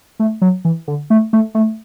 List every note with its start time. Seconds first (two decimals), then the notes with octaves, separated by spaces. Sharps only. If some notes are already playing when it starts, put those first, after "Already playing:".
0.19 A3
0.42 F#3
0.65 E3
0.88 D3
1.10 A3
1.33 A3
1.55 A3